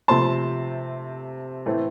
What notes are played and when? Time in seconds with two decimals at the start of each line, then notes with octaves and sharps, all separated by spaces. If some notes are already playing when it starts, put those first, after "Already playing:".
0.08 C3 F3 A3 C4 A5 C6
1.66 A2 E3 A3 C4